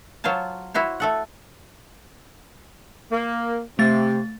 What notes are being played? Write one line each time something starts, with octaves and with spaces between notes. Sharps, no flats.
F#3 F4 C5 C#5 A5
E4 F#4 C5 C#5
A3 A4 F#5
A#3
C3 A3 A6